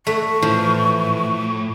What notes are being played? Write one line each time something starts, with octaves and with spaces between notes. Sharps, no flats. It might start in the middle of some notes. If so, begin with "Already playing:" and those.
A3 C#6
A2 E3 F3